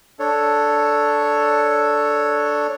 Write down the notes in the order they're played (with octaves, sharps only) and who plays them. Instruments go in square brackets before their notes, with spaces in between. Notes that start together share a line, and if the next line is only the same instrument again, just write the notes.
[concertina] D4 A4 C#5